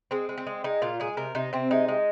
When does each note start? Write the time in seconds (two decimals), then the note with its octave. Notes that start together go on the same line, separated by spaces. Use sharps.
0.11 G#3 C4
0.29 G#3
0.38 C4
0.47 G#3
0.64 G#3 D#4
0.82 A#2 F4
1.00 G#3 G#4
1.17 C3 A#4
1.35 C3 D#4
1.53 C3 C4
1.71 G#3 D#4
1.88 G#3